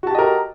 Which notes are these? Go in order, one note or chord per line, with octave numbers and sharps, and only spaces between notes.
F#4 G4 A#4 D#5 A5